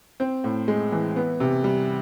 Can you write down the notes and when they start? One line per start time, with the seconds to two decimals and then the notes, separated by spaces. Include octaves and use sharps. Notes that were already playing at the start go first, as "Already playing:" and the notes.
0.20 C4
0.44 A2
0.68 G#3
0.92 E3
1.16 B3
1.40 C3
1.64 G3